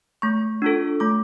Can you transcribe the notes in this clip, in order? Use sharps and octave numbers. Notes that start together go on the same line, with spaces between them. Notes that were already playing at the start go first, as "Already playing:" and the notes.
A3 C#6
D4 F4 A4
A3 D6